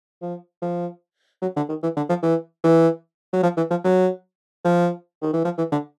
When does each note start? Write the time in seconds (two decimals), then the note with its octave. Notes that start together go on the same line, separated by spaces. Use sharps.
0.22 F3
0.62 F3
1.42 F#3
1.56 D3
1.69 D#3
1.83 E3
1.97 D3
2.09 F3
2.23 E3
2.64 E3
3.33 F#3
3.43 F3
3.57 E3
3.70 F3
3.84 F#3
4.64 F3
5.22 D#3
5.33 E3
5.45 F3
5.58 E3
5.72 D3